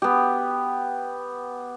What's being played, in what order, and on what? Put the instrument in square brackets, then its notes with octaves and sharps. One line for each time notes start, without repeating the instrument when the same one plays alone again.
[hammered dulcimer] B3 G4